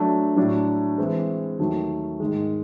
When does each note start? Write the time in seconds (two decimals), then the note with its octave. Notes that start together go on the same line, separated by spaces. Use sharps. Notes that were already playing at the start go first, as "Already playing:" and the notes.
Already playing: F#3 A3 D4
0.36 A2 F#3 A3 D4
0.98 E3 G#3 C4
1.59 D#2 D#3 F#3 A3
2.20 G#2 D#3 G#3